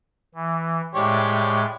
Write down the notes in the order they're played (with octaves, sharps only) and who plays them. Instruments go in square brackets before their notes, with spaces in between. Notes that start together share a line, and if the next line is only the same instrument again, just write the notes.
[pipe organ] E3
[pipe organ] A2 G#3 [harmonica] G4 C#5 D5